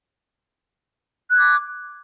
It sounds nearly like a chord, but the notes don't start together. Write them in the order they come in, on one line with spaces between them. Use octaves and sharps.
F#6 G#6 D6